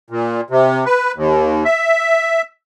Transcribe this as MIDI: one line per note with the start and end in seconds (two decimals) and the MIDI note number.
0.10 0.41 46
0.50 0.84 48
0.86 1.12 71
1.16 1.64 39
1.65 2.42 76